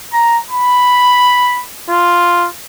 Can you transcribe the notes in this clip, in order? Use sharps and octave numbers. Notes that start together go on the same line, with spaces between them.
A#5
B5
F4